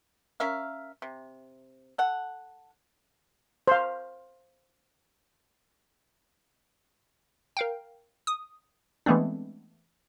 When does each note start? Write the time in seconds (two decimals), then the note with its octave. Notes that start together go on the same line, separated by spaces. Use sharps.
0.40 C#4 A#4 E5 F5
1.02 C3
1.98 A4 F#5
3.68 C5 F5
7.57 A#4 F5 G5
8.27 D#6
9.06 E3 G#3 A3 B3 C4 D4